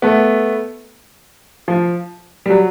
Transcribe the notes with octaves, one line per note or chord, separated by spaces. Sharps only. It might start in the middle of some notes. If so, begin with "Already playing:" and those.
A3 B3
F3
G3
F#3